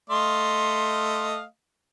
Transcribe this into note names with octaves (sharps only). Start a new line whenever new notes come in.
A3 D#5 F5 C6